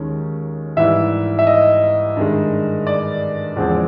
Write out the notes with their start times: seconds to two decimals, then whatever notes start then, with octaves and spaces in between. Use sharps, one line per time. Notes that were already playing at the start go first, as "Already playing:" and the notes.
Already playing: D#2 D#3 G#3 C#4
0.77 G#2 E3 G3 E5
1.39 E5
1.47 D#5
2.17 G2 D#3 G#3
2.87 D5
3.57 E2 C#3 F3 G#3 C4